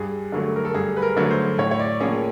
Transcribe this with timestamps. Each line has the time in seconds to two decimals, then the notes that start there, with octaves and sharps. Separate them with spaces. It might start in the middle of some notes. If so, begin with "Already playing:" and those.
Already playing: G2 G#4
0.32 D3 F#3 A3
0.56 A#4
0.65 A4
0.74 G2 G#4
0.97 B4
1.02 A#4
1.17 D3 F#3 A3
1.31 C5
1.59 A2 C#5
1.71 C#5
1.79 D5
2.01 F3 A#3 C#4 G#4